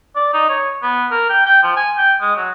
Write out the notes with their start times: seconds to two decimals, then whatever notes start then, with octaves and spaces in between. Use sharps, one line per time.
0.16 D5
0.33 D#4
0.49 C#5
0.82 B3
1.11 A#4
1.30 G5
1.46 G5
1.63 F3
1.77 G#5
1.98 G5
2.21 G#3
2.37 F#3